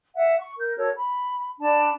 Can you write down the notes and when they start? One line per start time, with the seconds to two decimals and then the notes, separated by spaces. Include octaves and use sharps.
0.15 E5 F#5
0.39 C#6
0.58 A#4 G6
0.76 F#4 A4 A#4 C#5
0.95 B5
1.60 D4 D5 A5 B5